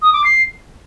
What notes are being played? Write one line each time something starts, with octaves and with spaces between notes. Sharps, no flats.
D#6
D6
C7